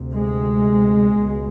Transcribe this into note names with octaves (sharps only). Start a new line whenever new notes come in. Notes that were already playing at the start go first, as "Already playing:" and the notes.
Already playing: D2 C3
G#3
C#2 B2